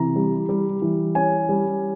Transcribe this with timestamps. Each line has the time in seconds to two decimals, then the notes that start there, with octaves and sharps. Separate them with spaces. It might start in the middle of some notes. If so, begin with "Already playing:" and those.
Already playing: C3 E3 A#5
0.16 G3
0.49 G3
0.82 E3
1.15 C#4 G#5
1.49 G3